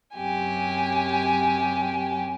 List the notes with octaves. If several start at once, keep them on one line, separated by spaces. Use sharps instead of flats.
F#2 C3 G4 G#5